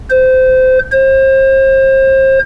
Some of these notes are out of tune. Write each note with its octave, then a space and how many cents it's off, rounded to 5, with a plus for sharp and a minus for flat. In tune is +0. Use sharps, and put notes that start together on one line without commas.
C5 -20
C5 +35